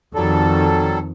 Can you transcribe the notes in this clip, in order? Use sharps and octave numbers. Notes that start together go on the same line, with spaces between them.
F2 D#3 F#3 G3 A4